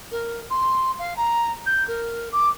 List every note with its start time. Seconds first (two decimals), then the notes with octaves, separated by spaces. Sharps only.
0.12 A#4
0.50 C6
0.99 F5
1.17 A#5
1.66 G6
1.88 A#4
2.32 D6